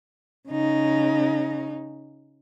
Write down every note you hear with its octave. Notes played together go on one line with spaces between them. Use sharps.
C#3 D#4